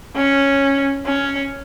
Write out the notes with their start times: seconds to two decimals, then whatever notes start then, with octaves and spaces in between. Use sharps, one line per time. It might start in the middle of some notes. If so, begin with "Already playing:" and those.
0.16 C#4
1.06 C#4